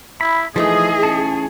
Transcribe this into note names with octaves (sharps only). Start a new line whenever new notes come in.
E4 B5
E3 F3 A3 D#4 G#4 D#5 D#6
C#4 A5